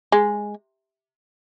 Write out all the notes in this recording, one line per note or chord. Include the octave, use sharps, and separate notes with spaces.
G#3